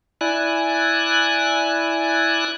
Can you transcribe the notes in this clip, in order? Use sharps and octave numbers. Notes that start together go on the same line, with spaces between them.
E4 D5 G#5 F#6